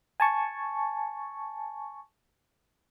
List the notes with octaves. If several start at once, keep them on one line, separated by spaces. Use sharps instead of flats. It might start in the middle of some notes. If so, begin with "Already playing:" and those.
G#5 A5 C#6